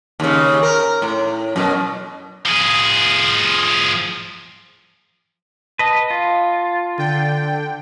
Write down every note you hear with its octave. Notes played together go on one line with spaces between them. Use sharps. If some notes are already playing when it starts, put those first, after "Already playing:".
D#2 C#3
A#4
A2
F#2 B2
F3 G#4
B4 D#5 A5
F4
D3 G5 A6